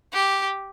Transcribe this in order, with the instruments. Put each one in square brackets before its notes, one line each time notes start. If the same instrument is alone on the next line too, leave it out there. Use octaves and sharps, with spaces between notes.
[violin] G4